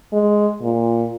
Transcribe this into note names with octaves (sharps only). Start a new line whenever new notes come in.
G#3
A#2